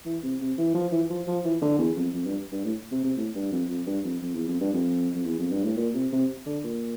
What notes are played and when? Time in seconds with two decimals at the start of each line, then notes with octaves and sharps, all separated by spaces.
0.05 E3
0.23 C3
0.40 C3
0.58 E3
0.74 F3
0.91 E3
1.10 F3
1.27 F3
1.44 E3
1.62 D3
1.78 E2
1.96 F2
2.14 F2
2.26 G2
2.52 G2
2.65 A2
2.92 C3
3.04 C3
3.17 A2
3.35 G2
3.52 F2
3.69 F2
3.86 G2
4.04 F2
4.22 F2
4.34 E2
4.47 F2
4.60 G2
4.73 F2
5.15 F2
5.25 E2
5.39 F2
5.51 G2
5.64 A2
5.77 A#2
5.94 C3
6.12 C3
6.46 D3
6.64 A#2